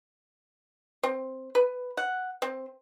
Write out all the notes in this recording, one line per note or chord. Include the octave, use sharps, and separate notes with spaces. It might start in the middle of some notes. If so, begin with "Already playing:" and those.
C4
B4
F#5
C4